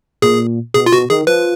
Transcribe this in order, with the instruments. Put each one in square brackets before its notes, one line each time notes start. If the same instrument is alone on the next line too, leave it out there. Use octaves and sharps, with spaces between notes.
[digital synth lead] A#2 [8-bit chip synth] G#4
[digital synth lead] B2 [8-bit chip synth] G#4
[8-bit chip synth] F4
[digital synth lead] B2 [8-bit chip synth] F#4
[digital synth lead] D#3 [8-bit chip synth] G#4
[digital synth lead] F3 [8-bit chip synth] B4